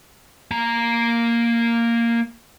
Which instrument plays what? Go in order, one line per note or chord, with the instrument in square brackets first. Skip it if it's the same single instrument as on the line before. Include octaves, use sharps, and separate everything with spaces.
[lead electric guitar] A#3 A#5